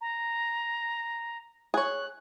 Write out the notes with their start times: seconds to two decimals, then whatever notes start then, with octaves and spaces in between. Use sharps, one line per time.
0.01 A#5
1.74 G#4 C#5 F#6